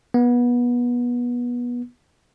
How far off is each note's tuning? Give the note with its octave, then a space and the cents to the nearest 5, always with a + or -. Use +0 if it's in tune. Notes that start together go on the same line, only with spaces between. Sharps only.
B3 -25